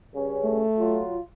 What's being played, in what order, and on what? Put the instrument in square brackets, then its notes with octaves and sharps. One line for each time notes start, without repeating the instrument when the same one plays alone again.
[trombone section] G2 C#3 C#4
[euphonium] A3
[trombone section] F#3 F4